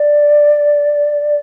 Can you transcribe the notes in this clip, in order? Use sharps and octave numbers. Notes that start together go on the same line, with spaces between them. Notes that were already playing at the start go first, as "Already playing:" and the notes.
Already playing: D5